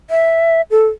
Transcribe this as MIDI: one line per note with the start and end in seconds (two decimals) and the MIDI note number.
0.10 0.62 76
0.71 0.87 69